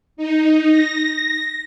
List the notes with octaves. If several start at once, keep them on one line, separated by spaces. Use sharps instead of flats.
D#4
A#6